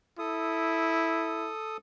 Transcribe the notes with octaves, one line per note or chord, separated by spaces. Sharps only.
E4 A4 D#6